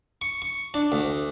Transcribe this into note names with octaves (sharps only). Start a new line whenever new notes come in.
C#6
C#6
D4
D2